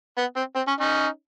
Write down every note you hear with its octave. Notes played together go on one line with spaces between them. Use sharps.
B3
C4
C4
C#4
C#4 D#4